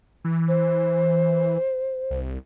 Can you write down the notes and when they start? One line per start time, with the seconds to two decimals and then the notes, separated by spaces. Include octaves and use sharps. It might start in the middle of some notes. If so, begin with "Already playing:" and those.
0.24 E3
0.48 C5
2.11 C2